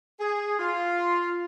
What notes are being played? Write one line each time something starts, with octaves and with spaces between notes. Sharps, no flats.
G#4
F4